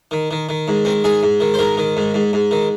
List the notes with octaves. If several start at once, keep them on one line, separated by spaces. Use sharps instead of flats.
D#3
D#3
D#3
G#2
D#3 C4
G#2 G#4
G#2
D#3
C5
G#2 A#4
D#3
G#2
G#2
G#2
D#3